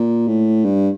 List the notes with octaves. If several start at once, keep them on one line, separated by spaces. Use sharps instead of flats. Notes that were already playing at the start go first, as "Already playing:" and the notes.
Already playing: A#2
A2
G2